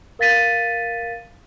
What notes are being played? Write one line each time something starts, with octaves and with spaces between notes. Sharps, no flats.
A#4 F5 A6 B6 D#7